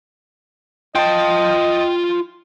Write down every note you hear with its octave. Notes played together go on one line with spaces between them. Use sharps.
F4 D#5 G5 A5